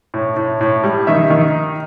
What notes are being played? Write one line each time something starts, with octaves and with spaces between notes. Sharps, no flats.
A2
A2
A2
G3
D#3 E5
D#3